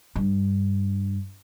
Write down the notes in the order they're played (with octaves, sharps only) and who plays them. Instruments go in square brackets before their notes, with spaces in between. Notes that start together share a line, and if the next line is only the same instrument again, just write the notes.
[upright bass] G2